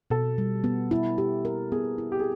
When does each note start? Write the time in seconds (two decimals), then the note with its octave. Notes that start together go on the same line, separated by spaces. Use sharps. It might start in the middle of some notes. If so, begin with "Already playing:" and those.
0.10 B2 A4
0.38 G3
0.64 B3
0.91 E4
1.18 G4
1.45 A#4
1.72 B3 G#4
1.98 E4
2.12 G4
2.20 G#4